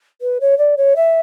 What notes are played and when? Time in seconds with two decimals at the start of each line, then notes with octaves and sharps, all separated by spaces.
0.22 B4
0.41 C#5
0.58 D5
0.77 C#5
0.96 E5